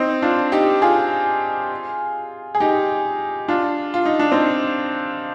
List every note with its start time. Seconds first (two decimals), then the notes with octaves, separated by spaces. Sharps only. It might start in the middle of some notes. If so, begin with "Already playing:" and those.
Already playing: C4 D#4
0.22 D4 F4
0.52 D#4 G4
0.82 F4 G#4
2.55 G#4
2.60 D#4 G4
3.48 D4 F4
3.94 F4
4.05 D#4
4.19 D4
4.32 C4 D#4